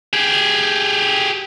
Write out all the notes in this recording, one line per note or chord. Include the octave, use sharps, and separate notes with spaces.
G4 G#4